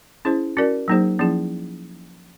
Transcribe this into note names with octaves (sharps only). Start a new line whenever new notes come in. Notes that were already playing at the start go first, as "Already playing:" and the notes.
C#4 E4 G#4 C5
C#4 F#4 A#4 D5
F#3 A#3 D#4 G#4 C5
F3 A#3 C#4 E4 G#4